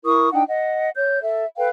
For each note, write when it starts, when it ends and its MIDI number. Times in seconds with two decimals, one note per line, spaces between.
0.04 0.29 64
0.04 0.29 70
0.04 0.29 85
0.04 0.29 87
0.32 0.41 62
0.32 0.41 63
0.32 0.41 78
0.32 0.41 79
0.47 0.89 75
0.47 0.89 78
0.95 1.18 73
0.95 1.18 91
1.23 1.45 69
1.23 1.45 76
1.58 1.69 69
1.58 1.69 71
1.58 1.69 77
1.58 1.69 79